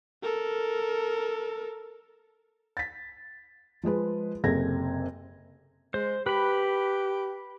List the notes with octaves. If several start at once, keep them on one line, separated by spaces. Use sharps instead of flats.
A4 A#4
A6 B6
F3 G#3 G#4 B4
F#1 C3 G#4 A4 G#6 A#6
G#3 C5
G4 B4 B5